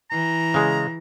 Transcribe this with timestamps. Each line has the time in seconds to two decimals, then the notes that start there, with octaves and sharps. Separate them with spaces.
0.11 E3 A#5
0.54 C#3 G#3